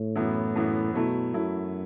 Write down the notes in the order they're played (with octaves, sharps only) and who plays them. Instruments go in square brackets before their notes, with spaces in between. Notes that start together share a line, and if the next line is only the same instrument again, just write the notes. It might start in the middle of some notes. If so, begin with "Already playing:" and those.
Already playing: [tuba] A2
[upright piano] F#2 E3 B3 E4
F#2 E3 B3 E4
[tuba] B2 [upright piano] F#3 A3 E4
[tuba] F#2 [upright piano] F#3 A3 E4